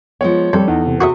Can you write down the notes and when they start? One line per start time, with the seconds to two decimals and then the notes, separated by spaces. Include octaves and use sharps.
0.21 F3 G#3 B3 C#5
0.53 F2 G3 A4
0.68 E2 D#4
0.87 C3
1.01 C3 F#4 G#4 E5 C#6